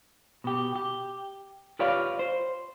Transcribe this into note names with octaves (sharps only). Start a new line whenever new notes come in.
B2 G4
G4
F4 G4 B4 C#5 D5 F5
C5